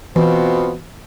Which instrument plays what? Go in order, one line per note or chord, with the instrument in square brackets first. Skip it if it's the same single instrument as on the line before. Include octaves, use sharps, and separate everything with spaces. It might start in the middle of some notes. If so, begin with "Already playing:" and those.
[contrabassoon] B2 [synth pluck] E3 [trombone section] B3 C4 F4